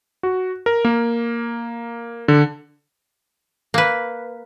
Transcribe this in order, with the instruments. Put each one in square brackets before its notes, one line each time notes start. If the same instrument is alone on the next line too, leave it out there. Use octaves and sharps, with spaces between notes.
[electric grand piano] F#4
A#4
A#3
D3
[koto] A#3 B4